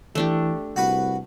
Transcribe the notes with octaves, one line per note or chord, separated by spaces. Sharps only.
E3 A3 D4 G4
C2 F#4 B4